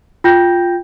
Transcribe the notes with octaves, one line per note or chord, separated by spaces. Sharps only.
F4 G5 G6 A#6